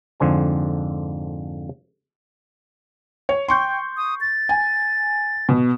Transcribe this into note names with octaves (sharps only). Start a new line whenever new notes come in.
F2 G#2 D3 C5 G#5 A#5
C#5
G5 C6 C#6 G6
D#6
A6
G#5
B2